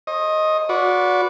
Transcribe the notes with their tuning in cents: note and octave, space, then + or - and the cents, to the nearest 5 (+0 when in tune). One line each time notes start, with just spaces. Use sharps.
C5 +45 D#5 +5
F#4 -30 B4 +0 D5 -25